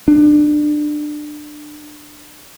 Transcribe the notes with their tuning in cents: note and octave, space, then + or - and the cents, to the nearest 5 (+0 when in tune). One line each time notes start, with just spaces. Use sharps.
D4 +25